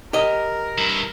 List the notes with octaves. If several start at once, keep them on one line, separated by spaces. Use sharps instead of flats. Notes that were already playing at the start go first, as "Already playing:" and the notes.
G4 A#4 D#5
G2 E4